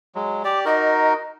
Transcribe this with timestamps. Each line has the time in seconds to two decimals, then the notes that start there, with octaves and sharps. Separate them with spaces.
0.15 F#3 G#3
0.44 G4 D5 D6
0.65 D#4 F#4 A#4 D#5